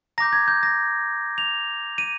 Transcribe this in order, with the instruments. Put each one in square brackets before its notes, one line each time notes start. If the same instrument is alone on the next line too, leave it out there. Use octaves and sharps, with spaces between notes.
[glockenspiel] A#5 A#6
D6 G6
G#6
G6
A#6
F7
D#7